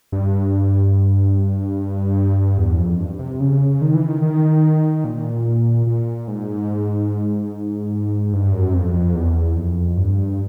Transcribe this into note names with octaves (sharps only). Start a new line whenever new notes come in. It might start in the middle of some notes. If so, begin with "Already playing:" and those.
G2
E2
F2
G2
C3
C#3
D#3
E3
D#3
D#3
A#2
A#2
G#2
G2
F#2
F2
F2
E2
F2
G2